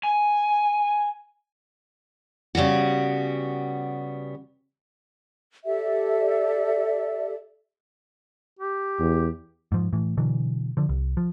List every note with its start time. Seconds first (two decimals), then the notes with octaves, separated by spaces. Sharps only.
0.03 G#5
2.55 C#3 G3 B3 F#4
5.65 G4 A4 D5 E5
8.59 G4
8.99 E2
9.72 G#2 F3
9.93 A2 E3
10.17 B2 D3 E3 F#3
10.77 D3 F3
10.89 C2
11.17 F3